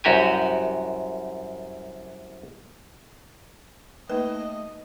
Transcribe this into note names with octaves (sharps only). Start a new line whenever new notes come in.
C2 F#2 F#4 G4 G#5
A3 A#3 D#4 B4 D#5